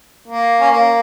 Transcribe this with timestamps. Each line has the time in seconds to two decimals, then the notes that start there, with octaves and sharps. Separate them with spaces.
0.28 A#3
0.61 C#4
0.71 A#3